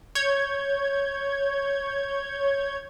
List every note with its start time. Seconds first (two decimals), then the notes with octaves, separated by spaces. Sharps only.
0.15 C#5 G6 G#6